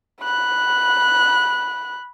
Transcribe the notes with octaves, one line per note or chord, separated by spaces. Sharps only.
B5 F#6